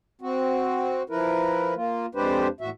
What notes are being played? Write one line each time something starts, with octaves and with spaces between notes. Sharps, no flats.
C4 F#4
F3 E4 A#4 B4
A#3 F4
F2 G#3 D4 G4 B4 C5
E2 A2 F#4 E5